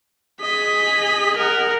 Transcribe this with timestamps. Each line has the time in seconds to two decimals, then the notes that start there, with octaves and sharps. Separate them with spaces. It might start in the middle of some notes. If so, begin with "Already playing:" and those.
0.41 G#4 D#5 B6
1.36 A#4 F#5